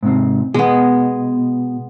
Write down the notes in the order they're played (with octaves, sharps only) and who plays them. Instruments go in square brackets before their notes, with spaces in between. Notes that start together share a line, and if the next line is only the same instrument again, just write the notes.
[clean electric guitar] G#2 C3 C4
[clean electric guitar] B2 [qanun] G#3 B3